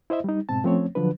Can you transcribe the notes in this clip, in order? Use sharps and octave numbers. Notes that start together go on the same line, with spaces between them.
E4 C5 D#5 E5
G3 D#4
G#2 B2 C4 A5
F3 A3 C4 C#4 C#5
D3 F3 F#3 D4 B4